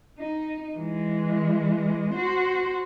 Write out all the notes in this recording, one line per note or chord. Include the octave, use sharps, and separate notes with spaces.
D#4
E3 G#3
F#4 C5